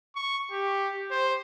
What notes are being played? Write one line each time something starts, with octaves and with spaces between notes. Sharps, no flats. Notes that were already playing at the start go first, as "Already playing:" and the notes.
C#6
G4
C5